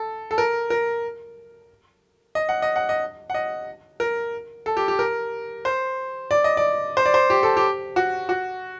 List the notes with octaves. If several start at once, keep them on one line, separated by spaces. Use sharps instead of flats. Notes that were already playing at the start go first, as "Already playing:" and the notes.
Already playing: A4
A4
A#4
A#4
D#5
F#5
D#5
F#5
D#5
F#5
D#5
A#4
A4
G4
G4
A#4
C5
D5
D#5
D5
C5
D5
C5
G4
A4
G4
F#4
F#4